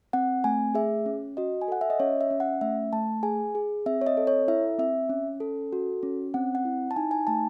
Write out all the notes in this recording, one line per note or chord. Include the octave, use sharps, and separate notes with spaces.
C4 F#5
A3 G#5
G#4 E5
C#4
F#4 D#5
G#5
A4 F#5
E5
D#5
C#4 C#5
E5
C#4
F#5
A3 E5
A3 A5
G#4 G#5
G#4
C4 E5
C#5
D#5
A4
C#5
E4 E5
C4 E5
C#4
A4
F#4
C#4
C4 F#5
F#5
E4
A5
D#4 G#5
G#5
A3 A5